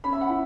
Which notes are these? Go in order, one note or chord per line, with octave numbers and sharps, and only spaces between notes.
C#4 B5
E5
F#5
E4 B5